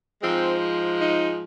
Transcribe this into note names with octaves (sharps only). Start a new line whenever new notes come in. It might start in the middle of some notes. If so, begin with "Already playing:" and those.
G#2 F3 G#3 C4
D#4